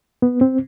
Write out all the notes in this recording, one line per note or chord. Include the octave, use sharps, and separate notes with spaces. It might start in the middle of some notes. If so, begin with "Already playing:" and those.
B3
C4